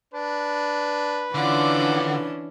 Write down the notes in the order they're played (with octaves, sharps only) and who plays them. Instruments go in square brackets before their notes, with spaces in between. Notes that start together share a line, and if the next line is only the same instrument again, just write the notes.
[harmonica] D4 [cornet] B4
[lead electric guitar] D3 [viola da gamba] E3 C#4 D4 [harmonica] F4 F#5 D6